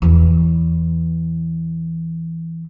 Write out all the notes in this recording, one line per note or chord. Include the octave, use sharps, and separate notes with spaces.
E2 E3